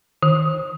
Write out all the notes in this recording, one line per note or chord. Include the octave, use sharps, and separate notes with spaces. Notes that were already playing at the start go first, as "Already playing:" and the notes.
D#3